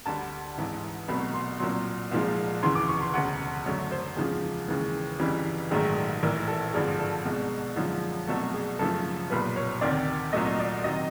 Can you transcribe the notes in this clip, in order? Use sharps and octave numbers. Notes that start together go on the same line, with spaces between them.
D2 D3 G3 A5
A1 G#2 E3
C2 B2 F#3 A3 B5
C6
C2 A#2 F#3 C6
C2 A#2 F3 G#3
D2 C#3 E3 C6
D6
C#6
C6
E1 D2 C#3 F#5
F#2 D3 F#3 A3 C#5
C5
E2 C#3 F3 G#3 G#4
D#2 C#3 E3 G#3
G1 F2 C#3 E3 G3
A#1 G#2 D#3 F#3 A3 G#4
A#1 A2 E3 A#4
A4
G#1 G2 D3 F3 G#4
A4
C2 B2 G#3
F#2 D3 F3 G#3
C2 B2 F#3 A3 A4
G#4
F#2 C#3 F3 A3 A4
B1 A#2 G3 B4
C#5
D2 C3 D#3 D5
C2 A#2 F#3 A3 D#5
D5
C3 D#3 F#3 D#5